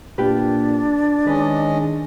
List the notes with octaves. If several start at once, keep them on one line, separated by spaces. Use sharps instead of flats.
A#2 D4 F4 G4 B4
D#3 G#3 C#4 B4 D#5